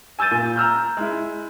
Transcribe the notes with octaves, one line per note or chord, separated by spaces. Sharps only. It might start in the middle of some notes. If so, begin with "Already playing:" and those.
G#5 E6 G6 A6 D#7
A#2
A#5 E6 F6 G6
G#3 E4